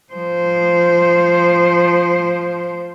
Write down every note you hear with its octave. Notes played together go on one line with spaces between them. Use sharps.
F3 C5